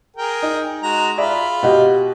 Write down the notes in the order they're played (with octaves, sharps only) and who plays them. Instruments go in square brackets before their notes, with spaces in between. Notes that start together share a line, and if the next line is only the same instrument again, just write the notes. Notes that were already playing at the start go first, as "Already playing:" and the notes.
[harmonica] G#4 A#4 G5
[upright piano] D#4
[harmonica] G#3 F#4 A#5
[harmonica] F4 B5 [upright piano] G#4 D5 E5
[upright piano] B2 [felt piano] G4 D#5 F#5